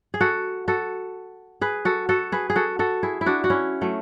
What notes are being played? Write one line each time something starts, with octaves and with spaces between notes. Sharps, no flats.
G#4
F#4 A4
F#4 A4
G#4 B4
F#4 A4
F#4 A4
G#4 B4
G#4
F#4 A4
F#4 A4
E4 G#4
E4
D4 F#4
F#4
C#4 E4
F#3 A3